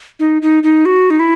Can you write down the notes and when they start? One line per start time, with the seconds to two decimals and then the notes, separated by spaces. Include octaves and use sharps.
0.19 D#4
0.42 D#4
0.63 D#4
0.85 F#4
1.10 D#4
1.19 E4